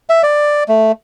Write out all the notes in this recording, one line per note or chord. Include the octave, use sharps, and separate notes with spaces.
E5
D5
A3